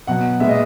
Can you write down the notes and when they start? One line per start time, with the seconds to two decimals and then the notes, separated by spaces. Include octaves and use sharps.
0.07 B2 F#3 B3 F#5
0.40 A#2 G#3 B3 E5
0.49 D#5